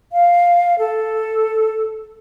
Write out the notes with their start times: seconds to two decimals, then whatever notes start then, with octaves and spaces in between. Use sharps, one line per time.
0.12 F5
0.79 A4